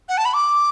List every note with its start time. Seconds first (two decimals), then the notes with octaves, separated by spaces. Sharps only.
0.09 F#5
0.18 A5
0.25 B5
0.34 D6